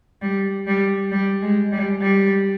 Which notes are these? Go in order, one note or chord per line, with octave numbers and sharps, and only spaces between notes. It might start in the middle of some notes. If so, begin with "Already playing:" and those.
G3
G3
G3
G#3
G3
G3